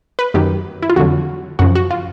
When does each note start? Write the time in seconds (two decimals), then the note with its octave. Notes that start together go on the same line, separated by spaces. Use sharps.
0.19 B4
0.34 F#2 D#3 F#3 G4
0.82 E4
0.90 F4
0.96 F2 D3 F#3 F#4
1.59 F#2 C#3 F3 F#4
1.76 F#4
1.91 F4